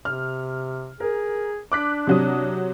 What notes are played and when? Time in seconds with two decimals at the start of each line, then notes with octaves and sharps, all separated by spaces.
0.05 C3 F6
1.00 G#4 A#4
1.72 D4 D6 F#6 B6
2.07 C3 F#3 D#6